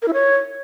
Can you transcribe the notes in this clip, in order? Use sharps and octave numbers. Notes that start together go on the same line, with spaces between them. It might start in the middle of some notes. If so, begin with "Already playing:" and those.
A#4
E4
C#5